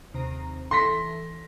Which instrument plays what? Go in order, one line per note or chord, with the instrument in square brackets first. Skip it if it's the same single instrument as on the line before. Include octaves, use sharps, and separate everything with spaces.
[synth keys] D#2 C3 A#5
[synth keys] A1 E3 A4 [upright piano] C6 A#6 B6